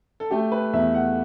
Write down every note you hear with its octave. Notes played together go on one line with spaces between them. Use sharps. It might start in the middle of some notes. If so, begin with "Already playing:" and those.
A4
A3 G4
B4
E2 E5
F#5